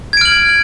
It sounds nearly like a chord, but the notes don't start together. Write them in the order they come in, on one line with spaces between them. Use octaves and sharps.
G#6 D7 F6 F#7